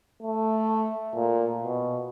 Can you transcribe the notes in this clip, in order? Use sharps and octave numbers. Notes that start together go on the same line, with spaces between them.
A3
A#2
B2